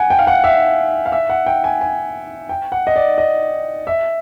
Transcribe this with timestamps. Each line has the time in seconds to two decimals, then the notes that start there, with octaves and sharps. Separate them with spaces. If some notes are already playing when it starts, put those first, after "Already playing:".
Already playing: F#5 G#5
0.10 G5
0.19 F5
0.27 F#5
0.44 E5
1.06 F5
1.12 E5
1.30 F#5
1.46 G5
1.64 G#5
1.81 G#5
2.49 G5
2.72 F#5
2.87 D#5
2.96 D5
3.18 D#5
3.87 E5